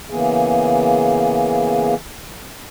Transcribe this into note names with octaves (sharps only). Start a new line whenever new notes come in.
C#3 E3 A#3 B3 G#4